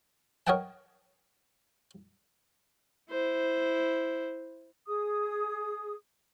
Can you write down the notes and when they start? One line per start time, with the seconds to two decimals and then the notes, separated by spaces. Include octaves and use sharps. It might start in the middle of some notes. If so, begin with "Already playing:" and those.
0.47 A#4 C#5 D#5 F#5 G5 A5
3.10 E4 C5
4.87 G#4 D#6